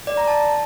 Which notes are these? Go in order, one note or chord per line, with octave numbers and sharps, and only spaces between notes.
D5
A#5
A5